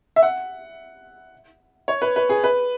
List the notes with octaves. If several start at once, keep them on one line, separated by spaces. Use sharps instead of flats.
E5
F#5
C#5
B4
B4
G#4
B4